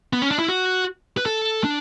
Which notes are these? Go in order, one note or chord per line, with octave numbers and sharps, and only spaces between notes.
B3
C#4
D4
E4
F#4
B4
A4
D4